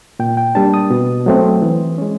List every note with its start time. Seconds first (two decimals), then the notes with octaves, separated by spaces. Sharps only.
0.19 A#2 G5
0.37 G5
0.55 G3 A#3 D4 A5
0.74 D#6
0.90 B2
1.26 F#3 A3 C4
1.62 E3
1.98 G#3 C#4